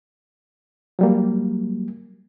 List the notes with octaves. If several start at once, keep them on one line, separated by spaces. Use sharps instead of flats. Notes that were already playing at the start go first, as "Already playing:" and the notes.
F#3 G3 A#3